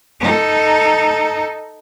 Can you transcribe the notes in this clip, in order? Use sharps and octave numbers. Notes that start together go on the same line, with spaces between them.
D#4 A4